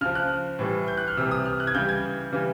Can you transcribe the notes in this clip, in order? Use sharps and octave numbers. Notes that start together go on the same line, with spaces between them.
C#3 F3 F6
F#6
A2 E3 G3
G6
F#6
F6
C3 E3 G3 E6
D#6
F6
F#6
G#6
C#3 E3 G3 G6
G#6
C#3 E3 G3